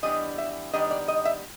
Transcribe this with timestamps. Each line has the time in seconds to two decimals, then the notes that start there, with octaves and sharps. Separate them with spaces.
0.03 E3 G3 B3 D4 D#5
0.38 E5
0.73 D#3 G3 B3 D4 D#5
0.91 D5
1.08 D#5
1.25 E5